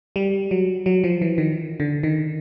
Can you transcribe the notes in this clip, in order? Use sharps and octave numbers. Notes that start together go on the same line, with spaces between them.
G3
F#3
F#3
F3
E3
D#3
D3
D#3